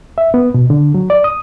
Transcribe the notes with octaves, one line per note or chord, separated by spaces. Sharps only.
E5
B3
B2
D3
F#3
D5
D#6